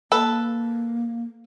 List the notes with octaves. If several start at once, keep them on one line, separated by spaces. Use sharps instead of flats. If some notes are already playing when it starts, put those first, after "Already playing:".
A#3 A4 B4